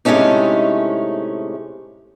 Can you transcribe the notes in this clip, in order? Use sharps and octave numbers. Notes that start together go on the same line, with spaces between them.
A2 C3 G#3 A3 C#4 D#4